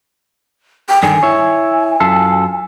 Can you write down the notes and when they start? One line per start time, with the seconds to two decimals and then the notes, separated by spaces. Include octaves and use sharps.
0.89 G5
1.03 G2 D3 D#3 G#5
1.23 E4 C#5
2.00 F#2 F4 A4